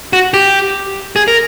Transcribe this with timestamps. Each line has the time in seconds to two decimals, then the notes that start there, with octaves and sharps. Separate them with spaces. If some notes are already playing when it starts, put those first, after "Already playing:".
0.13 F#4
0.34 G4
1.16 G#4
1.28 A#4